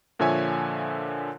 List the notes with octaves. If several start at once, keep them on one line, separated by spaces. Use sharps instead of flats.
A#2 D3 F3 C#5 E5 G#5